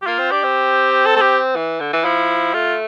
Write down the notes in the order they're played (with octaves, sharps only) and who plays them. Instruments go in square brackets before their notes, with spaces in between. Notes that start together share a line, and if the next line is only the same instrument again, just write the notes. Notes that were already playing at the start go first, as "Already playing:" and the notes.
[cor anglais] G4
[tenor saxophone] A#3 [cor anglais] F4
[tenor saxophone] C4
[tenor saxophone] D4 [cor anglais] G4
[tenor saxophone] C4
[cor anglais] A4
A4
G4
[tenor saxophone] E3
D3
E3
[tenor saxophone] F3 [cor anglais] E4
[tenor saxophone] A3 [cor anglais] F4